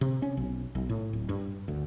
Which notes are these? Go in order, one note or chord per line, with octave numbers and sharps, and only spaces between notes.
C3
C#4
B1
B1
A2
D1
G2
D2